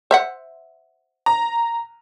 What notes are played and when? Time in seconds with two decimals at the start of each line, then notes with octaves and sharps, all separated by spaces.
0.11 C5 E5 F#5
1.26 A#5